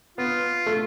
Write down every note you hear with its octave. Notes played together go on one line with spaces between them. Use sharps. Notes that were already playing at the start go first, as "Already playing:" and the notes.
B3 F4
A3